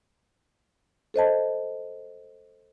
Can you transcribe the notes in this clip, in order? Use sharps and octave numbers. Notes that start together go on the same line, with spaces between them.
A4 C5 D#5 A5